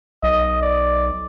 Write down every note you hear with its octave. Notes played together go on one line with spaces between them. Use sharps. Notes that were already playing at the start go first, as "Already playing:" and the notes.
B1 D#5
D5